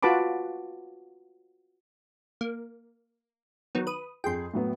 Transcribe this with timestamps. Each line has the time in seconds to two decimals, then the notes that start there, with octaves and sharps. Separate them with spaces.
0.03 F4 F#4 B4 A5 B5 D6
2.41 A#3
3.75 D#3 F#3 B3
3.87 B4 D#6
4.24 F2 G#4 G5 C6
4.53 A2 F#3 B3